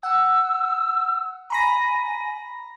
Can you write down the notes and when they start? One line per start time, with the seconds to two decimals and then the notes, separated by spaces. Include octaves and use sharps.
0.03 F#5 E6
1.50 G#5 A#5 B5 A#6